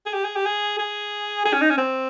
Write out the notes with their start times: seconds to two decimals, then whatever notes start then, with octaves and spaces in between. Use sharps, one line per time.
0.06 G#4
0.13 G4
0.24 G#4
0.36 G4
0.46 G#4
0.79 G#4
1.45 G#4
1.53 C#4
1.61 D#4
1.70 C#4
1.77 C4